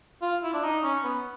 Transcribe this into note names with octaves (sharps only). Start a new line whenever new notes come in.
F4
E4
D4
D#4
C#4
B3